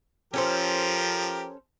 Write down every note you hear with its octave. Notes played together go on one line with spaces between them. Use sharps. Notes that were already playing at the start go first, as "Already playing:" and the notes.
F3 C#4 G4 A4 A#4 C5